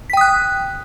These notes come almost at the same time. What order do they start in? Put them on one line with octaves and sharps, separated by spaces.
B6 G5 D#6 F#6